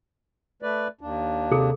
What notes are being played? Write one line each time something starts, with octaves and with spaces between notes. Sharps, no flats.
A3 B4 D5
D#2 D4
C3 G#4 A4